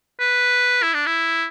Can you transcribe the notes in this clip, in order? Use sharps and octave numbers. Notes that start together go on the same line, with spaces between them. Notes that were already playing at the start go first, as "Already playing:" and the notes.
B4
E4
D4
E4